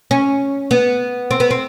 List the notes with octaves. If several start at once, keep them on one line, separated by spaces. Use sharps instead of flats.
C#4
B3
C4
B3
C4